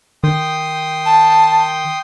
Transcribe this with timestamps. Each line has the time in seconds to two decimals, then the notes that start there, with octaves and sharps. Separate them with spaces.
0.24 D#3 G5 C6 D#6
1.06 A5